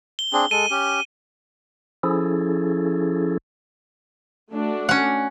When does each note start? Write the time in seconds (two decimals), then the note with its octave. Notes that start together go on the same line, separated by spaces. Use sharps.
0.19 G7
0.33 C4 D4 G#4
0.51 G#3 A4 D#7
0.71 C#4 G4
2.03 F3 C#4 E4 G#4 A4
4.51 A3 D4 F#4
4.89 C#4 F#5